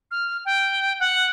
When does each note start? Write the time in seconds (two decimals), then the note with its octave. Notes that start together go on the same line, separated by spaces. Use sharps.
0.11 F6
0.45 G5
1.00 F#5